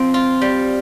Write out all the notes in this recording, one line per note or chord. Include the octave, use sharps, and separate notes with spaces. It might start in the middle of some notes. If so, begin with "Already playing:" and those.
Already playing: F3 C4
F4
G3